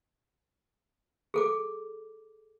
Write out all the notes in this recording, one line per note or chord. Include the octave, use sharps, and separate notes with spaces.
G#4 A4 D6